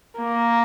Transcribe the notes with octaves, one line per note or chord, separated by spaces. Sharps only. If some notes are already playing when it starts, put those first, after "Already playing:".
A#3